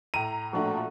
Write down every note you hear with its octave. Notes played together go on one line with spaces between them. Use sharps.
A2 A#5 D#7
A#2 F3 A3 D4 F#4 A#5